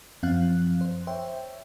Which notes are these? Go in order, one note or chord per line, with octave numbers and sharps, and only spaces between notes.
F#2 F3 C4 F5 F#6
C5
C5 C#5 E5 G5